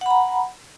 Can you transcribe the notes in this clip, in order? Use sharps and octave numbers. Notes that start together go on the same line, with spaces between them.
F#5 A#5 B5